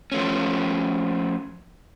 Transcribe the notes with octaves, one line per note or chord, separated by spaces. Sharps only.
F3 A3 C#4